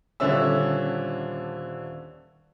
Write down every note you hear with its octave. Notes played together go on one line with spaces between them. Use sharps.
D#1 D3 C#4 D4 E5 E6